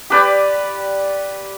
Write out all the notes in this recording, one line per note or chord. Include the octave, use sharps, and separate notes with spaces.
G4 B4 D5